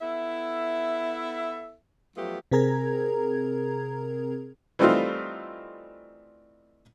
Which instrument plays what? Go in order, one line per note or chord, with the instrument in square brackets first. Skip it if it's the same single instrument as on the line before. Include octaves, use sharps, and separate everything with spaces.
[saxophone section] B3 E4 A4 E5
F3 F#3 A3 B3 F4 G4
[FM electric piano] C3 C4 G#4 A#4 A#5 G#6
[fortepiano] E3 G3 A3 C4 D#4 F4